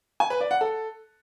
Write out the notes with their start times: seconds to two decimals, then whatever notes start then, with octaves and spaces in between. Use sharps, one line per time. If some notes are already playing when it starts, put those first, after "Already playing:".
0.20 G#5
0.30 B4
0.41 D5
0.51 F#5
0.61 A4